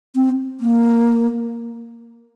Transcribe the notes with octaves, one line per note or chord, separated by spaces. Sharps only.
C4
A#3